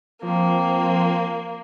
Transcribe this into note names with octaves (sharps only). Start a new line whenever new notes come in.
F3 A#3 C4